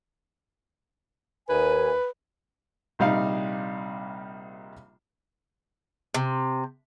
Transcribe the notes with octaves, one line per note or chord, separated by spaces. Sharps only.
D#2 B4 G#5
A#1 C3 G3 D#4 F5
C3